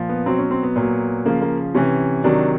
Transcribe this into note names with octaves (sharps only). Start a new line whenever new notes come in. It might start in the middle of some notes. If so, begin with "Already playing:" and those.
Already playing: A#2 F3
B3
B2 F#3 C4
C#4
C4
B3
A#2 F#3
C#3 F3 A#3
A#3
C3 E3 C#4
C3 D#3 F#3 D4